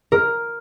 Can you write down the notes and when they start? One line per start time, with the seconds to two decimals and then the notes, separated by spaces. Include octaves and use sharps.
0.12 A#4